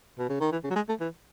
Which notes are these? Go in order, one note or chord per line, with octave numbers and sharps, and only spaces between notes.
B2
C#3
D#3
E3
C#3
F#3
G#3
A3
E3